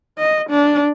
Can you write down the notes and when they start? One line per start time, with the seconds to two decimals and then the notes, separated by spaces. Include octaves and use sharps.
0.18 D#5
0.50 D4